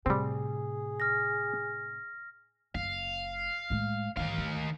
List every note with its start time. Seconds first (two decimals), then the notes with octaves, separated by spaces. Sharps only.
0.06 A2 C3 G3 C4 G#4
1.00 F6 A#6
2.75 F#1 F5
3.70 A2 G#3
4.17 G#2 D#3 E3 F5
4.38 D2